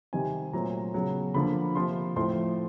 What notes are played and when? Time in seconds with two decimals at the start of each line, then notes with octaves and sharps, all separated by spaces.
0.13 C3 D#3 G3 C4 G#5
0.53 A#2 F#3 A3 C4 A#5
0.94 C#3 F#3 B3
1.34 D3 F3 A#3 B5
1.75 C3 F3 A#3 C6
2.16 A2 F3 A3 C4 C6